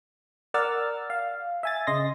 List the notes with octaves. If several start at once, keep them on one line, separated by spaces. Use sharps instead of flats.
A#4 D5 F#5 E6 F6 A6
F5
E5 G#5 A6
C#3 D#5 C6 A#6